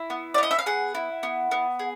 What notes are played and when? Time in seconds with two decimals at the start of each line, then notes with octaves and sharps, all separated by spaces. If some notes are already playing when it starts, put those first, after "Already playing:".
Already playing: E4
0.10 B3
0.34 D5
0.38 B3 D#5
0.51 E5
0.59 F5
0.66 G#4 F#5
0.95 E4
1.23 B3
1.51 B3
1.79 G#4